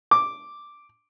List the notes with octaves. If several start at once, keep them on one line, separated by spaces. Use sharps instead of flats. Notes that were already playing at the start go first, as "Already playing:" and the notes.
D6